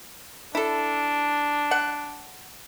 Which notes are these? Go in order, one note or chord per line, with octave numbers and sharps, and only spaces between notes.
D4 E4 A4
F#5